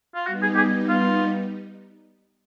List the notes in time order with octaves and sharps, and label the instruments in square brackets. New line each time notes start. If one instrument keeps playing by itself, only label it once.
[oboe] F4
[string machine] G3 B3 D#4 [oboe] F#4
[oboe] G#4
G4
G#4
F4